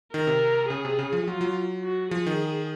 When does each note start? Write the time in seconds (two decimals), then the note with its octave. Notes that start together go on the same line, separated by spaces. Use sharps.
0.13 D#3 A#4
0.27 C3
0.70 C#3 G#4
0.85 C3
0.99 C#3
1.13 F3
1.27 F#3 F4
1.41 F#3
1.83 F#4
2.11 F3 G#4
2.26 D#3